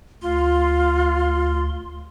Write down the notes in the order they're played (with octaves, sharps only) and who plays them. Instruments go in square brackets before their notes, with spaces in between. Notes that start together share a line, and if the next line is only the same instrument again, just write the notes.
[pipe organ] D2 C6 [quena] F4